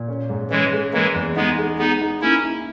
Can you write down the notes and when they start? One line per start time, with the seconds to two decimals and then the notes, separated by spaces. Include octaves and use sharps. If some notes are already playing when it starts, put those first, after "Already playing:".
Already playing: A#2
0.08 C#4
0.30 G#2
0.51 E3 G#3 C#4
0.73 G#4
0.93 E3 G#3 A#3
1.14 E2
1.36 G#3 B3 D#4
1.58 G#4
1.79 G#3 B3 D#4
2.01 D#4
2.21 A#3 C#4 E4
2.43 E4